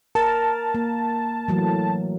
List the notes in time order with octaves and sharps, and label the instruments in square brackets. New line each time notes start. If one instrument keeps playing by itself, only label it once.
[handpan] A#4 [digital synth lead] A5
[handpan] A#3
E3 F#3 A3